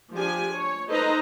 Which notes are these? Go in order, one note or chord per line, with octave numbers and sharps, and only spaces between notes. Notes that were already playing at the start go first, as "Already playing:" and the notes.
F3 D4 G4 G#5
C#5
D#4 A4 B4 C5 D#5 A#5